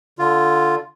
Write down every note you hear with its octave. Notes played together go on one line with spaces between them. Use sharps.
D3 F4